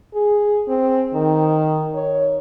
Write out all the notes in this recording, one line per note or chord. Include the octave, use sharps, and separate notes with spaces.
G#4
C4
D#3
C#5